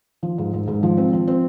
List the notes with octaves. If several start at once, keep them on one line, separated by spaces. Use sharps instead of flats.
F3
G#2
G#2
G#2
F3
C4
F3
C4